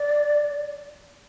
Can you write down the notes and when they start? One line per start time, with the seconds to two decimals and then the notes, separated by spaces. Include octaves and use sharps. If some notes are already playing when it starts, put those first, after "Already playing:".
Already playing: D5